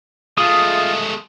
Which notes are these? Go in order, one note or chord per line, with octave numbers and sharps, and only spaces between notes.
G#3 A3 F4 D#6